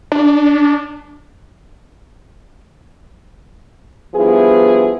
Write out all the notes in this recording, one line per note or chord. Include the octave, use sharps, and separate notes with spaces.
D4
G2 F3 B3 E4 G#4 B4